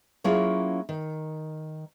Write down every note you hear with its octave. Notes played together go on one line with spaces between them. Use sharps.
F#3 A#3 C#4 E4 F4 G#4
D#3